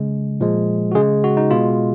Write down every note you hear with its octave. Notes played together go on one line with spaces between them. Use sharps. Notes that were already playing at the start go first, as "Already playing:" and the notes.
Already playing: C#3 G#3
A#2 F3 G#3
F#4
C#3 G#3 G#4
F#4
D#4
B2 G#3 F4